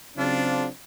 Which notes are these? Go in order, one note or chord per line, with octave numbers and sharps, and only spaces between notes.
C#3 F#3 C4 D4 F4